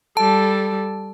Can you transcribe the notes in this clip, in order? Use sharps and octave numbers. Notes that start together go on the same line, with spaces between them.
G3 A4 A5